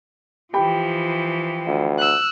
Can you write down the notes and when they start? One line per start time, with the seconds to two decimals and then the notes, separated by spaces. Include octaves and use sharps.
0.53 E3 F3 G4 G5 B5
1.67 D2
1.98 E6 F#6